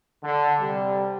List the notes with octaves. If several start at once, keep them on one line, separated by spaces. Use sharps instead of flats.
D3
C3 G3